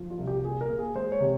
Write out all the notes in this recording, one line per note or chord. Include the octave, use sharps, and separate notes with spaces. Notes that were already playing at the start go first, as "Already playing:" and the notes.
Already playing: F3
F4
C2
G4
A#2 G#4
A#4
A#3
G#4
G#3 C5
C#5
C3